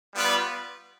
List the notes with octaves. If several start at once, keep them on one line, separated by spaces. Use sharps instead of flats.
G3 B3 F4 B4 D5